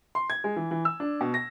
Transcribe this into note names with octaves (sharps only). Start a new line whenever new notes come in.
C6
G#6
G#3
E3
E3
E6
D4
B2
A#6